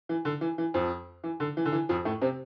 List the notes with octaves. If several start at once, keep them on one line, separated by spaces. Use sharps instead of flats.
E3
D3
E3
E3
F2 F3
E3
D3
E3
D3
E3
F2 F3
A2 A3
C3 C4